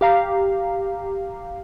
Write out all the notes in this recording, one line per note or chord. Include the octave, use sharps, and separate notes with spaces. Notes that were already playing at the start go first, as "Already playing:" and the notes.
G4 F5 A#5